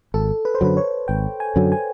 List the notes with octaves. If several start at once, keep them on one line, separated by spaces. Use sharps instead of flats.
G#1 A4
B4
C5
F#2 D3 F#3 B4
C#5
G#1 G5
G#5
F#2 D3 F#3
G#5